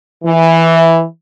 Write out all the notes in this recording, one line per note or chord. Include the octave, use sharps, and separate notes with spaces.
E3